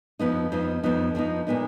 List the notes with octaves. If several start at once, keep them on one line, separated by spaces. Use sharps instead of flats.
F2 F3 B3 D#4
F2 F3 B3 D#4
F2 F3 B3 D#4
F2 F3 B3 D#4
A#2 G#3 B3 D#4